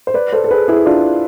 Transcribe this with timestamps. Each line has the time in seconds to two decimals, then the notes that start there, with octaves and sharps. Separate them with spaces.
0.07 C5
0.14 B4 D5
0.33 A4 C5
0.44 A4
0.51 G#4 B4
0.68 E4 G#4
0.86 D4 F4